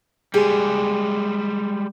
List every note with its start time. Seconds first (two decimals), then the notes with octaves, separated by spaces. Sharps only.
0.34 G3 G#3 G4 G#4